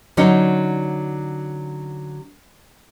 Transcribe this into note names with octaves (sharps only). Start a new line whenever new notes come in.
D3 F#3 C#4 D#4